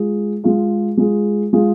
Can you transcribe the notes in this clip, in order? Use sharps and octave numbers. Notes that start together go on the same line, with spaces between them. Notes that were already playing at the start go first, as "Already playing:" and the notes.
Already playing: G#3 F4 G#4
G#3 F4 G#4
G#3 F4 G#4
G#3 F4 G#4